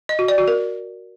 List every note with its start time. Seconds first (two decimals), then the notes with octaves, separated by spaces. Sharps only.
0.09 D#5
0.19 F#4
0.28 D5
0.38 F#4
0.48 A#4